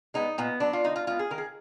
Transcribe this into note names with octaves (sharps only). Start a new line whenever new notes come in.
G#3 B3 D#4
A#2 B3
F#3 B3 D4
F4
D3 D#4
F4
G#3 B3 F4
G#4
D#3 A#4
G#4